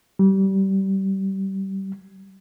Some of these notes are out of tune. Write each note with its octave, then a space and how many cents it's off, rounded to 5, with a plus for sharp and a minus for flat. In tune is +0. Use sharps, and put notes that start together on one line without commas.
G3 -25